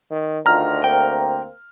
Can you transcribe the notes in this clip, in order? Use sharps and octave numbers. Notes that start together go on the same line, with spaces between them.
D#3
D2 D#3 D4 F4 A#5 F6
A#3 C4 G5